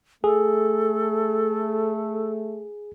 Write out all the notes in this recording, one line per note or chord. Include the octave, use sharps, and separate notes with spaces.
A3 G#4 A4